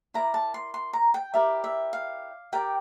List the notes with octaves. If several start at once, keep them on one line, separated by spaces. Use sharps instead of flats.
E4 A#4 D5 A#5
A5
C6
C6
A#5
G5
E4 G4 A#4 D5 E5
E5
F5
G4 A#4 D5 G5